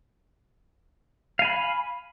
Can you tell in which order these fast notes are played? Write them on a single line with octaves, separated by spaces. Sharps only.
F5 G#5 B5